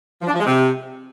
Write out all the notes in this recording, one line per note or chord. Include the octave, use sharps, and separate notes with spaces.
F3
D4
F3
G#3
C3